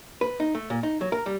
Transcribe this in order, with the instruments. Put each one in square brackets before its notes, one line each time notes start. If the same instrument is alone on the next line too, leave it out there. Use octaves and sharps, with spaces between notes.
[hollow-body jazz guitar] B4
D#4
A3
A#2
D#4
F#3
A#4
G3